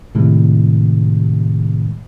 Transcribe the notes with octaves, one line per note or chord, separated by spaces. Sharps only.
A2 C3 D#3 G3 G#3